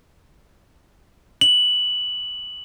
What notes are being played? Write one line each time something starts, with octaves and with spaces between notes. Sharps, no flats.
F#7